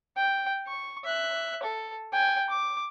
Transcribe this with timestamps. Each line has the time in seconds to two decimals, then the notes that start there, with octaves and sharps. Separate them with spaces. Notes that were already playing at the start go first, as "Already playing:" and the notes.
0.17 G5
0.67 C#6
1.04 E5 F#6
1.63 A4
2.12 G5 G#5
2.49 D6